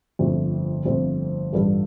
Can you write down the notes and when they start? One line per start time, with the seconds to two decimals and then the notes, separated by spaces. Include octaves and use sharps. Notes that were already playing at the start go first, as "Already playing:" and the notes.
0.19 G1 F2 F3 A3 C4
0.85 G1 F2 F3 A3 C4
1.53 A1 G2 G3 F4 A4